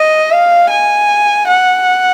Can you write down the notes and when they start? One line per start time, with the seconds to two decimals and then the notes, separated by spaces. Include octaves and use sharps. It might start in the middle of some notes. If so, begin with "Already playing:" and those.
Already playing: D#5
0.31 F5
0.70 G#5
1.48 F#5